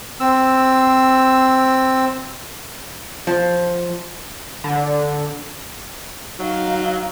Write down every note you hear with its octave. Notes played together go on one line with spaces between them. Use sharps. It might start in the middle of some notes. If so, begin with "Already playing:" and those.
C4 E6
F3
D3
F#3 D#4 F5